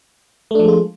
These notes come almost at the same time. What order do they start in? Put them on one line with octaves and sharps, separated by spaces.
A3 D4 F3 G#3 F4